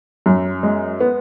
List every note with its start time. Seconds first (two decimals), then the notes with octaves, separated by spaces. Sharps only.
0.26 F#2
0.63 G#3
1.00 B3